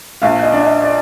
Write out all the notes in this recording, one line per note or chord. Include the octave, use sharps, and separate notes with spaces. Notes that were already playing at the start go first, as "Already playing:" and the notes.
A#1 F5
D#5
D4
D#5
D5